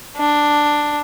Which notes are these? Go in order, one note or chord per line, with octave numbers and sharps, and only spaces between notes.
D4